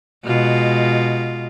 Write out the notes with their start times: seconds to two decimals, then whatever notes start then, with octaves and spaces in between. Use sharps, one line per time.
0.24 B2 G#3 F4